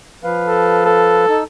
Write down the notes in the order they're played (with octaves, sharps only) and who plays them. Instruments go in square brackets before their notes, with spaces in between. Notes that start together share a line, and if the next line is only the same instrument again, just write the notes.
[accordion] F3 B4 F5
[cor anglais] A4
A4
[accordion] D#4 E6